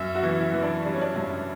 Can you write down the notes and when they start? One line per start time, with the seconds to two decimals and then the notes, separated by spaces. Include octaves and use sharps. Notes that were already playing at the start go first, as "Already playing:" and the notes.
Already playing: F#2 E5
0.15 F#4
0.23 E3
0.39 E4
0.54 E3
0.63 D4
0.85 G3 D4
0.94 C#4
1.01 D4
1.16 F#2